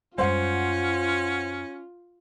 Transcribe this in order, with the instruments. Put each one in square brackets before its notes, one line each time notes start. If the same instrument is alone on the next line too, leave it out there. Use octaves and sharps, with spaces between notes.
[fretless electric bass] F#2 G3 G#3 [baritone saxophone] C#4 [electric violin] F4 [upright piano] C5 F#5